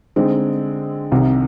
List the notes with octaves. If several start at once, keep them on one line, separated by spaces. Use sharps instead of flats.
D3 G#3 C4 D#4
C2 C3 D#3